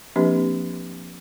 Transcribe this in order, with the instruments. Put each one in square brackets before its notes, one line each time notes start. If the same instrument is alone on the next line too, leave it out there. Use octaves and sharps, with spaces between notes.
[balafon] F3 A#3 C4 D4 G4 B4